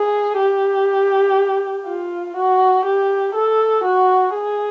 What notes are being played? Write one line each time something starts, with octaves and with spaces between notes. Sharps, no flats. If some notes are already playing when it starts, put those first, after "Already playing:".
Already playing: G#4
G4
F4
F#4
G4
A4
F#4
G#4